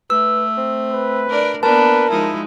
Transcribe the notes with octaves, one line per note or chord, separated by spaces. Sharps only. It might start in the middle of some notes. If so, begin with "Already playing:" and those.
A3 B4 E6
C4
B4
D4 A#4 D5
A#3 B3 D4 A#4 B4 A5
F3 G#3 D#4 E4